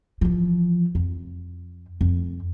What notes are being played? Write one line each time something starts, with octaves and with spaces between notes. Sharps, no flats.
E3 F3
F2
F2